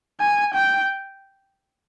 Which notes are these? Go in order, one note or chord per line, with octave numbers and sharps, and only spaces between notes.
G#5
G5